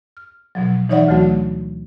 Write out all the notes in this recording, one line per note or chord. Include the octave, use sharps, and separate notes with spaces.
F6
B2 F3 F#3
E3 D#4 C#5 D5 E5 F#5
D2 E3 F#3 A3 F#4